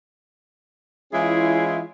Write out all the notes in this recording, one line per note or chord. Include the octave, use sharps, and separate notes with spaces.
E3 G#3 C#4 E4 F4 G#4